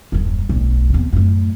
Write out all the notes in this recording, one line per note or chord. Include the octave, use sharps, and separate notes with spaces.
D#1 F#2
D1 B1
E2 C3
F#2 A2